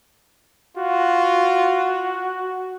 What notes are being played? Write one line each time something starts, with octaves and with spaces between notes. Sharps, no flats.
F4 F#4